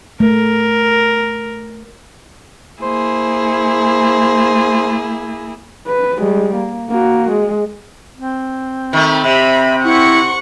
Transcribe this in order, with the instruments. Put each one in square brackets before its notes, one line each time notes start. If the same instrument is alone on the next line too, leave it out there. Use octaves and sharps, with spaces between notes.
[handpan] A3 [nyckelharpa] A#4
[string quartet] A#3 E4 G#4 [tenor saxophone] C5
[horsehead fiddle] B4
G3 G#3
A#3
A#3 F#4
G#3
[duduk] C4
[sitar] D#3 A3 [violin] E5 B5
[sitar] C3 [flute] E5 [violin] B5
[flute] E4 [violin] F#5 C#6